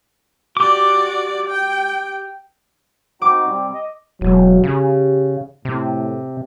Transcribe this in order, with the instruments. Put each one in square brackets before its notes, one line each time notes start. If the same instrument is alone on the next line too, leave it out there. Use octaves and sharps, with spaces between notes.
[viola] F#4 D5 [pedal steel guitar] G4 D6
[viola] G5
[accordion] C4 D#4 F#4 [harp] D6
[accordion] C3 G3 C4
D#5
[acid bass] E1 [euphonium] F#3
[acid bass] C#3 [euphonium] G4
[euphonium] A2 [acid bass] C3